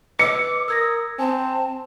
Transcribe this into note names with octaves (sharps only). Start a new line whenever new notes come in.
B4 D#5 D6 E6 C#7
A#4 D#6 E6 G#6 A#6
C4 G#5 A5